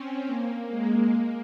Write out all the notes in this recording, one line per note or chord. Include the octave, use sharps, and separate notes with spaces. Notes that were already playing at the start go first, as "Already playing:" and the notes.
Already playing: C4 C#4
A#3
G#3
A#3